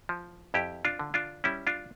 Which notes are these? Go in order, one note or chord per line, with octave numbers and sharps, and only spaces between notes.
F3
F2 E4 G4
D4 F4
D3
D4 F4
G3 C#4 E4
D4 F4